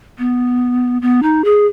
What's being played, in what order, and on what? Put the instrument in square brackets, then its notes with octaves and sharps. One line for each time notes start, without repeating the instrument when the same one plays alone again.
[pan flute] B3
B3
D#4
G#4